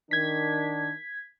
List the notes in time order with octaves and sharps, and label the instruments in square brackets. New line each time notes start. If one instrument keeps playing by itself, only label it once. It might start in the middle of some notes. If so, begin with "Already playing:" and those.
[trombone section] D#3 D4 [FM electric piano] G#6 B6